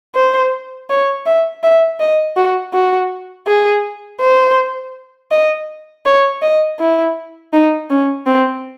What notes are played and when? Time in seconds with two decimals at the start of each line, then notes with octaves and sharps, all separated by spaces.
0.15 C5
0.90 C#5
1.26 E5
1.64 E5
2.00 D#5
2.36 F#4
2.73 F#4
3.47 G#4
4.21 C5
5.31 D#5
6.06 C#5
6.42 D#5
6.79 E4
7.53 D#4
7.90 C#4
8.27 C4